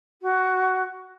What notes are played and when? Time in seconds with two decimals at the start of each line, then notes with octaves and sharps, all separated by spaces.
0.22 F#4